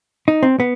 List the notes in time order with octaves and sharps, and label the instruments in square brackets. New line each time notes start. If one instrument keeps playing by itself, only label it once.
[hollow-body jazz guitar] D#4
C4
B3